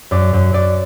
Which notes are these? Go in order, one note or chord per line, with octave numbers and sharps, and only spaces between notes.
F#2 D5 D6
F#2
F#2 D5 D6